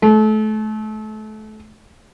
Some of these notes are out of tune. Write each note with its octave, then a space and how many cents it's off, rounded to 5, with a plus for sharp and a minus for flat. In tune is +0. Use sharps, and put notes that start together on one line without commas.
A3 -30